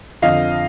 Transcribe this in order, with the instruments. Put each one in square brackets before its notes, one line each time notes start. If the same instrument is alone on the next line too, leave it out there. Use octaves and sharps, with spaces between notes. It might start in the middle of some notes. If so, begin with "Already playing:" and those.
[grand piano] F2 D3 F3 D#5 F5